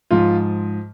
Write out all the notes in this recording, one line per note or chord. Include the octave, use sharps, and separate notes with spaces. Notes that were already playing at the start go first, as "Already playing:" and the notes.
G#2 F3 F4